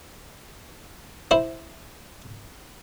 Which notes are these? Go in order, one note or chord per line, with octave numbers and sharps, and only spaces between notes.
E4 C5